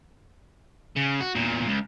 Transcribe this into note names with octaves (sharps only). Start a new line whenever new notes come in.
C#3
F#4
E2 A#2
C#2